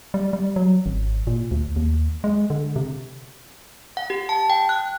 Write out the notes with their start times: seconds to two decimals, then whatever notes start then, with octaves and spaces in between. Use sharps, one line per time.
0.14 G3
0.33 G3
0.56 F#3
0.86 G#1
1.27 A#2
1.51 D2
1.76 D#2
2.24 G#3
2.50 D3
2.76 C3
3.97 F#5
4.10 G4
4.29 A5
4.50 G5
4.69 F#6